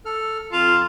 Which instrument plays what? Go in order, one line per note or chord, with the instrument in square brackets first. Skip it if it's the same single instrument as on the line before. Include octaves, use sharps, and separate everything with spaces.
[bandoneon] A4 F6
[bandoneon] F2 A5 [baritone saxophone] F4